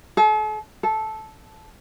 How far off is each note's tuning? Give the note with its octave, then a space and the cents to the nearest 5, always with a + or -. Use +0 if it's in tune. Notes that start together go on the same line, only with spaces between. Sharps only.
A4 -45
A4 -10